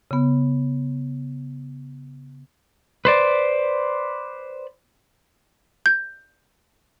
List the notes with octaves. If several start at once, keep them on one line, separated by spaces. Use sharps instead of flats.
C#3 B3
B4 C5 D5
G6